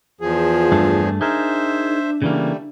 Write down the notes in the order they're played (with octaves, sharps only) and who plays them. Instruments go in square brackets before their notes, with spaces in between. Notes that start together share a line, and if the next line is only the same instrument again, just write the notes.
[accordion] E2 F3 G#4 [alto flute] F4
[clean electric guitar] G2 A3 D4
[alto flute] D4 [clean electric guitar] D#4 G#4 A#4 [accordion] C5 E5
[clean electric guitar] C#3 E3 A#3 [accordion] G3 A3